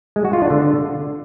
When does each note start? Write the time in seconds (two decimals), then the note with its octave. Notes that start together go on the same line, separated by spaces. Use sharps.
0.16 G#3
0.25 F#4
0.33 F4
0.42 D4
0.50 D3